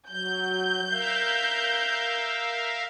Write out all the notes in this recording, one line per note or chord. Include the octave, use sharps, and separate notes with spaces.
F#3 G6
A#4 E5 F5